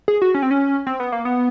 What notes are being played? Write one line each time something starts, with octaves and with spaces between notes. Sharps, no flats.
G#4
F#4
C#4
C4
C#4
C4
B3
A#3
B3